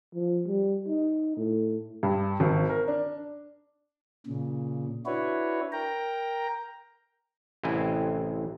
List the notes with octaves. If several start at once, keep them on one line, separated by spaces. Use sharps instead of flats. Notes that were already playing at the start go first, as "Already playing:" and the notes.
F3
G3
D#4
A2
G2
G#1
A#4
D4
A#2 C#3
D4 E4 F#4 B4 C#5
A#4 G5 A#5
A1 C3 C4 E4 G#5